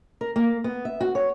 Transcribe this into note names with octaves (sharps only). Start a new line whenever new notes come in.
A#4
A#3
B3
E5
F#4
C#5